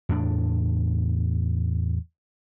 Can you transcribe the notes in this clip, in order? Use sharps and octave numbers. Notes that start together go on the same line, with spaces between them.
E2 A2 D4